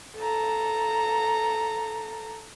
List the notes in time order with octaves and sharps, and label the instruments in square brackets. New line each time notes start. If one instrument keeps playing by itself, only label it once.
[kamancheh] A4 A#5